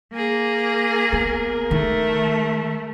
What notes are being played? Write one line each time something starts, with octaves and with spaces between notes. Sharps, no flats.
A#3 G#4
B3 A#4
D#3 A3